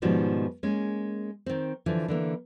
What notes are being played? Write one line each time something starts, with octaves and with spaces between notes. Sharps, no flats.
G#2 B2 D#3 F3 G3
G#3 A#3 C#4
D#3 C4
D3 E3 F3
D3 E3 A#3